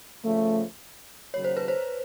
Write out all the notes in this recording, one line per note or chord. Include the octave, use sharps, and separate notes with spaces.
C#3 F3 A3
D#2 C#3 F#3 C#5
C5
B4
C5